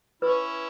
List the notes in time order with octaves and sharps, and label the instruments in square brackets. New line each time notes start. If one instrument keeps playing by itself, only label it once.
[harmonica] C#4 E4 [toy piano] B4